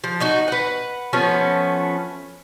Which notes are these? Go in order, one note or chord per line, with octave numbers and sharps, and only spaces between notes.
F3
D#4 F#4 D#5
B4 F#5
F3 A3 B3 C#4